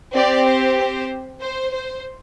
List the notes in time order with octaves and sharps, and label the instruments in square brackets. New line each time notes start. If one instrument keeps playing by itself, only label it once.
[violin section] C4 G4 D5
C5
C5
C5
C5